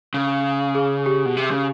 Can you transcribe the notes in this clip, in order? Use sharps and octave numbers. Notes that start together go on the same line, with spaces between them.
C#3
G#4
G4
B2
C3
C#3